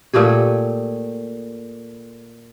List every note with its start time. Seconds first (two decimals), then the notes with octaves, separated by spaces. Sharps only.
0.14 A#2 A3 G4 G#4